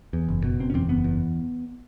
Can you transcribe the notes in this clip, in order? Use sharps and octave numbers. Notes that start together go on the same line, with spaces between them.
E2
F#1
B2
F#1 C4
C#4
E2 C4
F#1 B3
E2